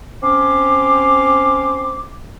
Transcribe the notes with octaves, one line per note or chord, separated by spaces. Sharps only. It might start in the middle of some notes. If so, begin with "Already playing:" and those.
C4 C#4 C6 D6